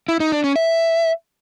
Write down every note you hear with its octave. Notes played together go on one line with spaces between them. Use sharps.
E4
D#4
D4
C#4
E5